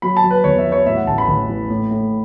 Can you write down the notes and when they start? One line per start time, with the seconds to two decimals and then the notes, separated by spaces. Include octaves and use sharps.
0.02 F#3 B5
0.17 A5
0.24 F#3
0.31 B4
0.44 E2 C#5
0.59 E5
0.66 F#3
0.72 C#5
0.86 A2 E5
0.97 F#5
1.07 A1 A5
1.18 B5
1.28 A1
1.49 E3
1.70 A2
1.91 A2